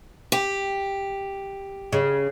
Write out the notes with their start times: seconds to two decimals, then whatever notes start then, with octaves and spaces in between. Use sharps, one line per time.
0.32 G4
1.93 C#3